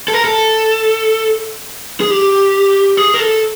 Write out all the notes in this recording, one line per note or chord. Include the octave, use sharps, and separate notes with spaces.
A4
A#4
A4
G#4
G4
G#4
A#4
A4